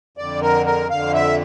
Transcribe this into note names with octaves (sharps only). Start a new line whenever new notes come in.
F2 D3 D5
A#4
A#4
F2 D3 F5
E5